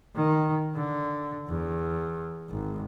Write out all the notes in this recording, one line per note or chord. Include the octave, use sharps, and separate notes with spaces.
D#3
D3
E2
G#1